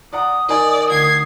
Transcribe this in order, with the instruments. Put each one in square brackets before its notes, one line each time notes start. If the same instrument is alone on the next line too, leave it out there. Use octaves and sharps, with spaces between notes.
[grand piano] D5 F#5 A#5 [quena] D#6
[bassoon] D#3 [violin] D5 [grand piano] D#5 G#5 D6
[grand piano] D2 [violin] G#6 C7